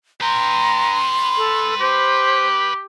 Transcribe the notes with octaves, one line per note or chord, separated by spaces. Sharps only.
B4 G5 A#5 C6
A4
G4 C5